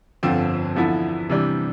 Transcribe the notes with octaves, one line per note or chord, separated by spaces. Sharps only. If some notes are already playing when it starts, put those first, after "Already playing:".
G1 F2 D3 F3 C4
E2 D3 F3 B3 E4
C3 E3 G3 D4